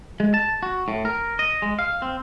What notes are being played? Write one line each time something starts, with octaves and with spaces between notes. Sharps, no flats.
G#3
A5
F#4
A2
A#4
D#5
G#3
F5
C4